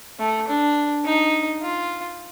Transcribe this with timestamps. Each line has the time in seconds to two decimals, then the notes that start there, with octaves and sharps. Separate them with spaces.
0.19 A3
0.48 D4
1.05 D#4
1.62 F4